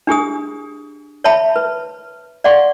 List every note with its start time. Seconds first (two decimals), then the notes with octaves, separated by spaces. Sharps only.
0.07 D4 G4 G#4 D#6
1.24 C#5 E5 A5 B5
1.56 B4
2.44 D5 F5 F#5 C6 C#6